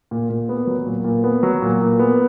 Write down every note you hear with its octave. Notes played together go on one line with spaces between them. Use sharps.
A#2
A#2
B3
F#3
A#2
A#2
B3
F#3
A#2
A#2
B3